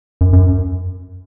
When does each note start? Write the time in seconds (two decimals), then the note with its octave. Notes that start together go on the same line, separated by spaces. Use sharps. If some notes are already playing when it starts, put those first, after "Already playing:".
0.21 F#2
0.33 F#2